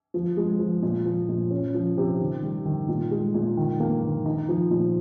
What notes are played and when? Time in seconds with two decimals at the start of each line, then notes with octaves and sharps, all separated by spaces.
0.14 F3
0.37 G#3
0.59 F3
0.82 A#2
1.05 F3
1.29 A#2
1.51 C#4
1.74 F3
1.97 C3
2.20 D#3
2.43 G3
2.66 D#3
2.88 A#2
3.11 G#3
3.34 A#2
3.57 D#3
3.80 A#3
4.03 D#3
4.26 D#4
4.49 F3
4.71 A#2